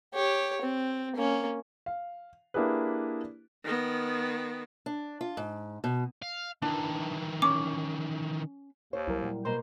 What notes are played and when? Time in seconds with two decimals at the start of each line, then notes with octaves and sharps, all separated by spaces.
0.14 G4 C#5
0.62 C4
1.16 A#3 C#4
1.86 F5
2.54 A#3 D4 E4 G4 G#4 B4
3.64 D#3 B3
4.86 D4
5.21 F4
5.37 G#2
5.84 B2
6.22 F5
6.62 D#3 E3 D4
7.42 C#4 D6
8.93 D#2 C5 C#5
9.07 C2 F#3 G3 E4 A#4
9.23 A#2 F#3 G3
9.45 B2 A#3 C5 A#5 C6